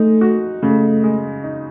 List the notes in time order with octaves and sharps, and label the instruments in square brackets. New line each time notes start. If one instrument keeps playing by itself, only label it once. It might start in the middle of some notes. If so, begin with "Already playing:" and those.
Already playing: [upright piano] G#3 D#4 [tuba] A3
[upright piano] F#4
[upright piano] C#3 [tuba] A3
[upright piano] G#3
D#4